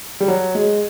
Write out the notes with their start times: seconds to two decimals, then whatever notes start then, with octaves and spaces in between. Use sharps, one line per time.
0.20 G3
0.28 F#3
0.55 G#3